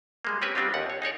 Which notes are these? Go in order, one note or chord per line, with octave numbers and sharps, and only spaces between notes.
G3 G#3 A#3
C4 C#4 G4 G#4 B4 G#5
G3 B3 C4 D4 F4 G4
D#2 F#5
C#5
D#4 G#4 C#5 D5